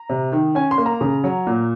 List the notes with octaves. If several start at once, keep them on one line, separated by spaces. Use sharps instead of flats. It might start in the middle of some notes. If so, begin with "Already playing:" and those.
Already playing: A#5
C3
D#3
C#4 G#5
C6
A#3
A#5
C#3
F#3
A#2